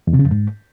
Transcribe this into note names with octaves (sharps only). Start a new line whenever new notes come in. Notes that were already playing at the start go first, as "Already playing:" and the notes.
E2
C3
C#3
F2
G#2